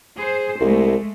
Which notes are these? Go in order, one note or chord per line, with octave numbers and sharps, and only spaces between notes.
G#4 C5
C2 G#3 A3